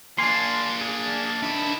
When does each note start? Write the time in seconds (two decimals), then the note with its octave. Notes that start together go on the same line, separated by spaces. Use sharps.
0.18 A#3 D4 G#5 C6
0.81 G#4
1.42 D#3 D4 E4